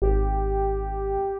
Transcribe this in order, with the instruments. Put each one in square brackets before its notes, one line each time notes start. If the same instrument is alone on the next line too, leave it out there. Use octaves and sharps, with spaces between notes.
[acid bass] G#1 [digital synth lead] G4